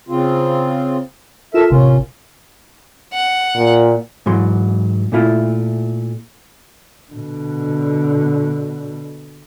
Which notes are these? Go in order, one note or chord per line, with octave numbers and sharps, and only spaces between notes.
C#3 C4 F4
F4 A4 A#4 E5 E7
A1 C3 C#4 F4 A#4
F#5
A#2
G#2 E3 F#3 C6
A#2 A3 E4 F4
B2 D3